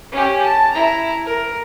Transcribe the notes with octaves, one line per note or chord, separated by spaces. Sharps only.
C#4 G4
A5
E4 A#5
A#4